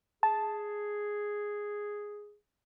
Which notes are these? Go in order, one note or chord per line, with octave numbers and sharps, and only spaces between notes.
G#4 A5